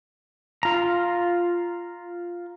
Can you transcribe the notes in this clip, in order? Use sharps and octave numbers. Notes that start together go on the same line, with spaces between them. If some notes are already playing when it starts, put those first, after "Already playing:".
F4 A#5